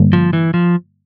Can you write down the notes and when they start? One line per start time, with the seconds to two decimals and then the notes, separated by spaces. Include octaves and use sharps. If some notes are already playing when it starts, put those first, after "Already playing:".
Already playing: G2 D3 G3 A#3
0.13 F3
0.33 E3
0.54 F3